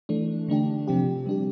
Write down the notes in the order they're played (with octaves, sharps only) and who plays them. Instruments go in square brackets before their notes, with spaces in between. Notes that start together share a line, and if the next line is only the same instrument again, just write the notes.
[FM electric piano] E3 A3 D4
D3 A3 D4 G4
C3 F3 C4 G4
G3 D4 G4